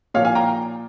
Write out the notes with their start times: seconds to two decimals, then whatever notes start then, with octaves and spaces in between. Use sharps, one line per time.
0.14 A#2 F3 C#5 F5
0.25 F5 G#5
0.35 G5 A#5